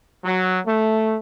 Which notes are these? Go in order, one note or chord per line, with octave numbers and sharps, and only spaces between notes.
F#3
A3